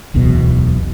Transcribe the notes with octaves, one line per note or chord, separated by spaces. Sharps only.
D1 B1 E2 B2